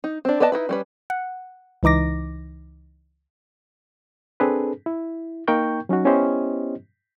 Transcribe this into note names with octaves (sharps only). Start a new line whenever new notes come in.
D#4
C4 D4
B3 B4 D5 D#5 A5
D#4 E4 B4
G3 C#4 B4
F#5
C#2 E3 D#4 D6 A#6
C4 D4 G#4 A4 B4
E4
A#3 D#4 A#4 G5 C#6 G6
F#3 C#4 D#4 F#4
B3 C#4 E4 G4 C5 D#5